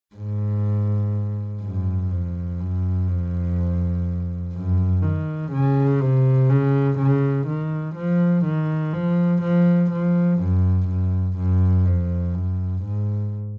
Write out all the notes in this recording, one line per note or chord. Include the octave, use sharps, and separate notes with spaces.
G#2
F#2
F2
F#2
F2
F#2
D#3
C#3
C3
C#3
C#3
D#3
F3
D#3
F3
F3
F3
F#2
F#2
F#2
F2
F#2
G#2